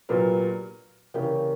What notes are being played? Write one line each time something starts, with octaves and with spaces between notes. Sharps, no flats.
A#2 F#3 B3 D4 G4 A#4 B4
C#3 E3 A#3 D4 G4 A#4 C#5